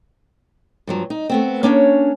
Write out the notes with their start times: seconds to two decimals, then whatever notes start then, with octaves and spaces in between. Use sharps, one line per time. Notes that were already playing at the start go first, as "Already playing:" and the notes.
0.87 G2 F3 F#3
1.10 D#4
1.30 A3 B3 C4
1.63 A#3 C#4 D4 C#5